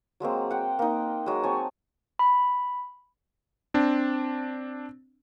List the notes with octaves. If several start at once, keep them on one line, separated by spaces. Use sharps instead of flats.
F#3 G#3 A#3 C4
F#5 G5
A#3 D#4
F#3 G#3
C4 C#5 G#5 A5
B5
C4 D4